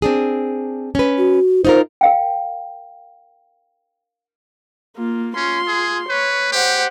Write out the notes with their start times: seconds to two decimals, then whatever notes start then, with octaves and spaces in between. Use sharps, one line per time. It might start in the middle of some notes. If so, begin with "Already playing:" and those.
0.02 C4 D4 G#4
0.95 C#4 B4
1.18 F#4
1.65 D#4 F4 A#4 C5
2.01 A#4 F5 G5
4.97 A#3 F4
5.36 C#4 F4 C6
5.68 G#4
6.09 B4 C#5
6.52 G4 C5 F#5